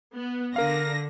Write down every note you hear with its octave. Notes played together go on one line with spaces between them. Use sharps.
B3
D3 A#4 F5 A#6